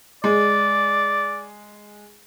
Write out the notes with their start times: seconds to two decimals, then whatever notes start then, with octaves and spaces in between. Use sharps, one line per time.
0.24 G#3 D5